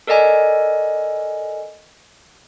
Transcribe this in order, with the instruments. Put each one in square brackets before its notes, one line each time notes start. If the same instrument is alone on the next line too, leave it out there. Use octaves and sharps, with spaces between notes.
[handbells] A4 A#4 D5 D#5 G#5